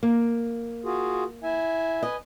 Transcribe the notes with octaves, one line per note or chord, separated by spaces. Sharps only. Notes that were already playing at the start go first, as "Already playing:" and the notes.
A#3
F4 F#4 G#4
E4 E5 G#5
B4 D#5 G#5